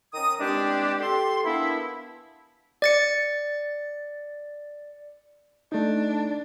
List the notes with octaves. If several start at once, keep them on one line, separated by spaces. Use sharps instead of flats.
D#3 C#4 A#5 D#6
E3 G3 G#3 C4 D4 G4
G4 A4 C6
E3 A#3 B3 D4 E4
D5 A6 C#7
A3 D4 D#4